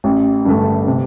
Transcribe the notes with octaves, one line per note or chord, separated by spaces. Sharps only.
A1
G2 D3 A3
C3